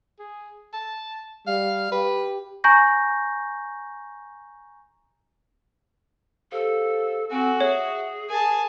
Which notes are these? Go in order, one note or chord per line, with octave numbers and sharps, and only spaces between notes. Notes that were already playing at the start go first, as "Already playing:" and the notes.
G#4
A5
G3 F5
G4 B4
G#5 A#5 C#6 G6 A#6
G4 A4 C5 F5
C4 F#4 A4 G#5
G#4 C#5 E5
A#4 G#5 A5